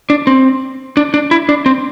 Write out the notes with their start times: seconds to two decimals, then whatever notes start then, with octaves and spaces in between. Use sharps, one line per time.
0.10 D4
0.27 C4
0.97 D4
1.14 D4
1.31 E4
1.49 D4
1.66 C4